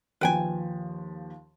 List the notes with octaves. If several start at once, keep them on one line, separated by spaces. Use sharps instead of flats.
D#2 F3 B4 G5 G#5